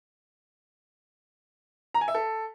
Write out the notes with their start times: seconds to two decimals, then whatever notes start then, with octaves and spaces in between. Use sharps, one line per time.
1.94 A#5
2.01 G#5
2.08 E5
2.15 A4